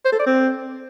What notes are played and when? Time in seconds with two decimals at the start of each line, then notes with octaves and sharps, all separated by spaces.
0.05 C5
0.12 A4
0.19 D5
0.27 C4